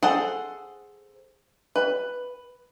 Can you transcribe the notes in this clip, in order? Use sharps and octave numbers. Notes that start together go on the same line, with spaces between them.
G#4 A4 C5 F#5
B4